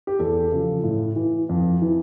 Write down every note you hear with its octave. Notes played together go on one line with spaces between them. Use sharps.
G4
E2 A4
C#3 F3
A2
E3
F2
E3